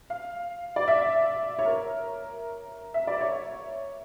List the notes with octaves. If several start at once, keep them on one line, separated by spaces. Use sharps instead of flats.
F5
D5
E5
C#5
A#4
E5
D5
C#5